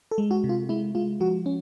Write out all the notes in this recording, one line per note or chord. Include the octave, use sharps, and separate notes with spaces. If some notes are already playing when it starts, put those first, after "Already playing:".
A4
G#3
F#4
C3
F4
G#3 E4
G#3 F4
F3 F#4
C#4